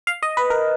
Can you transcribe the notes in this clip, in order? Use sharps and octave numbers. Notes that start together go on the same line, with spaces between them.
F5
D#5
B4
A#4